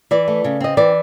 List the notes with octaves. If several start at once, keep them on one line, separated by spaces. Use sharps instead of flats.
E3 D5
A3
C#3
C4 D#5
E3 D5